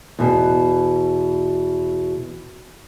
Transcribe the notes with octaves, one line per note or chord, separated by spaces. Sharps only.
E2 B2